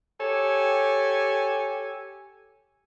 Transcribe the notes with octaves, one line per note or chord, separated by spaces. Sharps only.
G4 A4 C#5 G#5